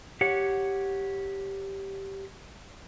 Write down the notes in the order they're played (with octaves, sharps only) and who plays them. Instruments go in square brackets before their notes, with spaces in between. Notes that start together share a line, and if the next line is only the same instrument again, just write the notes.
[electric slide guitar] G4 C#5 F#5